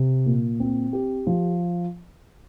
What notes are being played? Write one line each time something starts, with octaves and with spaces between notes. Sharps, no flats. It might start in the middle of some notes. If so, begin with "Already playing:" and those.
Already playing: C3
A#2
C4
G4
F3